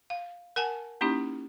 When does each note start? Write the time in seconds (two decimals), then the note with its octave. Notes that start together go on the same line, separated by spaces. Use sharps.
0.10 F5
0.56 A#4 F#5 G#5 A5
1.01 A#3 C#4 D#4 E4 G4